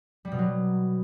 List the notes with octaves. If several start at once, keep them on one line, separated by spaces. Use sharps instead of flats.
G3
B2
F#3